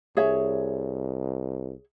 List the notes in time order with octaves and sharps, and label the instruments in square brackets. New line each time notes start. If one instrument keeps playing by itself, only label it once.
[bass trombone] C2 [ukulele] G#4 C#5 E5